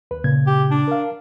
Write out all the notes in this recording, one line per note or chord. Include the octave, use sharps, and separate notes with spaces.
D#2 B4
A#2 C#3 G#6
G4
D4
A#4 F5